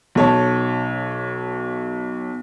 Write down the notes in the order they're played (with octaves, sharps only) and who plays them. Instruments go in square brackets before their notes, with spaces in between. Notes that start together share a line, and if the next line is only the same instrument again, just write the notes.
[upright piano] B1 C#5 A5